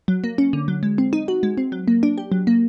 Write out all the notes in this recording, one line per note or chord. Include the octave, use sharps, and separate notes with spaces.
F#3
A#3
C#4
D3
F#3
G#3
C4
D#4
F#4
G#3
C4
F#3
A#3
D4
G4
F#3
A#3